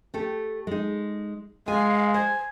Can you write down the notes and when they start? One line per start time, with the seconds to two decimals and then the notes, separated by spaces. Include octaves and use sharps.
0.14 A3 G4 A4
0.67 G#3 D#4
1.68 G#3 F5 G#5
2.14 C5 G#5